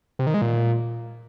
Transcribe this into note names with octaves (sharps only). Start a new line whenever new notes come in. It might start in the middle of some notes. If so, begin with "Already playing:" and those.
C3
D#3
G#3
A#2